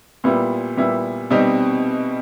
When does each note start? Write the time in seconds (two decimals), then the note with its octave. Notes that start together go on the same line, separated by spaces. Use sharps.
0.24 A#2 G3 B3 E4
0.77 A#2 G3 B3 E4
1.31 B2 G3 C4 D#4